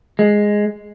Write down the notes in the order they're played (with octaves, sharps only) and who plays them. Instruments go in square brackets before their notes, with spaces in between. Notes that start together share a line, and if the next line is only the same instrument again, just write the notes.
[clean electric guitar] G#3